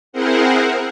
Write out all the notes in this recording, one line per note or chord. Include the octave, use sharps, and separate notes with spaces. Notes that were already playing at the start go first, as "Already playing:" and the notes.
C4 E4 G#4 A#4 C5 F#5